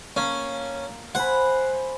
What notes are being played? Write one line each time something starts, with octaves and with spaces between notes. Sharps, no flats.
A#3 C#4 F5 A5
C5 F#5 G#5 B5